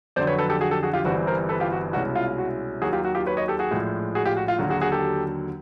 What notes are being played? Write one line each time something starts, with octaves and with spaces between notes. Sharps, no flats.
F2 D3 F#3 C5 D5
B4 C#5
A4 B4
G4 A4
F#4 G#4
G4 A4
F#4 G#4
F4 G4
G1 G2 E3 G3 C4 F#4
A#4 C5
A4 B4
F4 G4
F#4
C2 B2 G#3 C#4 E4 F#4
F4
F#4
D#2 D#3 F#3 F#4 G#4
F4 G4
F#4
F4 G4
B4 C#5
C#5 D#5
G4 A4
F#4 G#4
A#1 A2 F3 G#3
F#4 G#4
F4 G4
F#4
F4
D#2 D3 F#3 F#4
F#4 G#4
F#4 G#4
G4 A4